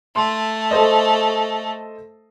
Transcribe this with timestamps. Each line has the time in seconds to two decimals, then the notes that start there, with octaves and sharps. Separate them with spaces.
0.16 A3 C6
0.71 A4 C5 D#5